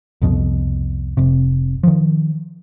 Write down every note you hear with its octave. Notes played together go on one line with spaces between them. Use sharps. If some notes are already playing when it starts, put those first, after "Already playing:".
C2 F2 B2
F1 C3
D#3 F3